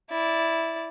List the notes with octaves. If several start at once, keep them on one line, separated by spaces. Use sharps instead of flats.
E4 D5